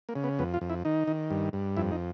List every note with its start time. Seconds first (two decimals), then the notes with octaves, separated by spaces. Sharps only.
0.09 A#3
0.15 C#3
0.24 B3
0.39 F2 B3
0.54 F4
0.61 F2
0.69 E4
0.85 D#3 D#4
1.08 D#3
1.30 G2
1.53 G2
1.77 F2 E4
1.91 D#4